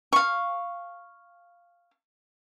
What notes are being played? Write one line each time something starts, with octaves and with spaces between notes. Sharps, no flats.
F5 C#6